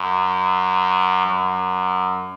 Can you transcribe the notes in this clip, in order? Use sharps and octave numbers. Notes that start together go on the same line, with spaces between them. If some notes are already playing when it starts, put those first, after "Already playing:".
Already playing: F#2
F#2